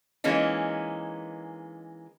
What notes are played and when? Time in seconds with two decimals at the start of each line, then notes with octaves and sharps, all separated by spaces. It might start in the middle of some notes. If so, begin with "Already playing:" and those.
0.24 E3 G#3 A#3 C#4 D#4